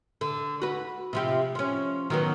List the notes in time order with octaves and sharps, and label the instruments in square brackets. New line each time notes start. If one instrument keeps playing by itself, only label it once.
[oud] D3
F#4 B4
C3 F3 G4
F3 C#4
D#3 F#3 B3